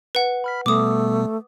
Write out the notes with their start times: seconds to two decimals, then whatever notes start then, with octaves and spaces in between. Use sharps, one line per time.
0.15 B4 F#5
0.44 B5 F6 B6
0.66 B2 G3 A3 B3 D6 D#6